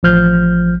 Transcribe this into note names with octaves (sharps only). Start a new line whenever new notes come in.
A1 F3 F6 G6